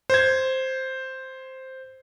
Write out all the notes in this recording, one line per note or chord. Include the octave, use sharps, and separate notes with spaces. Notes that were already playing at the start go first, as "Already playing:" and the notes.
C5 G#6